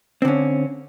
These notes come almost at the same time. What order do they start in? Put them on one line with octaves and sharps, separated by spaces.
C4 D3 C#4